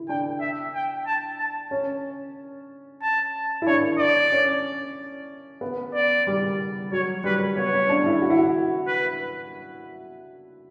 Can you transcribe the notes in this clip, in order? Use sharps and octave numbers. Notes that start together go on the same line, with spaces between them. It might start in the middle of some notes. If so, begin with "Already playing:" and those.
Already playing: E4
D4 G5
E5
G5
A5
A5
C#4
A5
E4
D4 C#5
D5
C#4
B3
D5
G3
F#3 C#5
G3 B4
B3 C#5
C#4
D4
E4
F#4
E4
F#4
B4